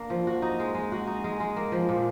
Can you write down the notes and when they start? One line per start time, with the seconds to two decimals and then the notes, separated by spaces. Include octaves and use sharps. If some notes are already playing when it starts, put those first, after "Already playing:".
Already playing: A#3 D4
0.10 F3
0.27 F#4
0.42 D#4
0.60 G#3
0.75 G#3
0.92 F#4
1.07 D#4
1.24 G#3
1.40 G#3
1.56 A#3
1.72 F3
1.89 A#2